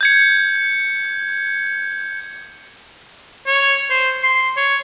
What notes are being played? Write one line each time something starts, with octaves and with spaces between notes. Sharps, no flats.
G6 G#6 C#7
C#5
C5
C6
C#5